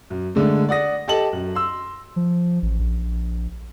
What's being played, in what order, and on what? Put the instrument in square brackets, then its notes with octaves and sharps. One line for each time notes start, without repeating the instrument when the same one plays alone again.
[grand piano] F#2
D3 G#3 A3
D5 F#5 D#6 A#6
G4 A4 D#5 A5 F#7
F#2
C6 E6
[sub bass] F3
A1
A#1